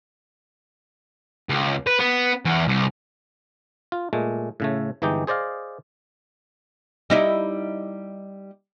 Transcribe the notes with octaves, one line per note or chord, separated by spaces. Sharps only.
C#2
B4
B3
E2
C2
F4
A#2 G#3 A3
A2 C#3 A3
G1 E3 G#3 D#4 G4 G5
G#4 C5 D5 D#5 F5
G3 D#4 E4